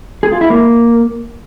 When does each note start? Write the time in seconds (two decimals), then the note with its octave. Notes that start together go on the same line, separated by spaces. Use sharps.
0.23 G#4
0.32 F4
0.41 E4
0.50 A#3